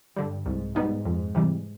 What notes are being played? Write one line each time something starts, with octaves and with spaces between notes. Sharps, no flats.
G2 D3 G3
C2 G#2
G#2 B2 G3 B3 D#4
F2 G#2
C3 E3 G3